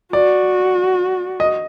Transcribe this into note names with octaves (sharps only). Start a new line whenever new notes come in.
F#4 D5
D#5